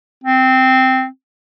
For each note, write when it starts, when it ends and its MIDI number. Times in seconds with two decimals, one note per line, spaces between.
0.24 1.06 60